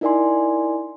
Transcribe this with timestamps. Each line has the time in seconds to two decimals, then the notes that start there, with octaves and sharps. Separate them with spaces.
0.01 D#4 E4 A#4 D5 G#5 C6